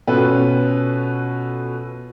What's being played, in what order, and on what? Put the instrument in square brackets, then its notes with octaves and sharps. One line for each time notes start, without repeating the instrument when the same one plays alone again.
[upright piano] B2 C#4 F4 A4 B4